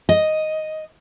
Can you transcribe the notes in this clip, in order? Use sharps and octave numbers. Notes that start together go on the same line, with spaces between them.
D#5